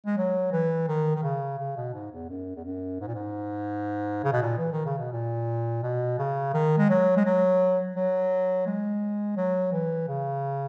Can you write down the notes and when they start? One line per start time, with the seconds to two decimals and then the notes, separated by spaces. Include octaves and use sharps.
0.06 G#3
0.17 F#3
0.52 E3
0.88 D#3
1.16 D#3
1.23 C#3
1.59 C#3
1.76 B2
1.94 G#2
2.12 E2
2.29 F#2
2.56 E2
2.65 F#2
3.00 G#2
3.08 A#2
3.15 G#2
4.24 C#3
4.33 B2
4.42 A#2
4.58 E3
4.72 D#3
4.86 C#3
4.99 B2
5.13 A#2
5.83 B2
6.19 C#3
6.54 D#3
6.78 G#3
6.90 F#3
7.17 G#3
7.25 F#3
7.96 F#3
8.66 G#3
9.37 F#3
9.72 E3
10.08 C#3